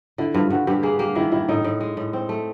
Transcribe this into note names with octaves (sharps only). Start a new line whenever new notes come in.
D3 E4
G2 F4
G2 F#4
G2 G4
A#3 G#4
A#3 G4
D#3 E4
D#3 E4
A2 D#4
A2
G#3
A2
C4
A3